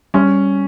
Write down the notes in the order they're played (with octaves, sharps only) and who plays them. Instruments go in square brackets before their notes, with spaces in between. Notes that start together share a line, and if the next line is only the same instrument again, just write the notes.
[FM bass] G3 [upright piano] C#4